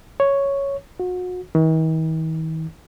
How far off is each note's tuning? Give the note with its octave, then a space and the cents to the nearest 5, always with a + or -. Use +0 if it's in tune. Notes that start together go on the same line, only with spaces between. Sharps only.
C#5 +0
F#4 -35
D#3 +45